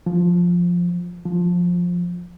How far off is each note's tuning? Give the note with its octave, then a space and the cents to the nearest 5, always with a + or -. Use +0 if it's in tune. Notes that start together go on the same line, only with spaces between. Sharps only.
F3 +10
F3 +15